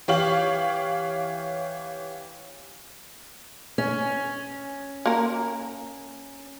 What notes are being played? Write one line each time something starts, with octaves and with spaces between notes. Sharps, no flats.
E3 G4 C#5 F5 F#7
C#4
A#3 A#4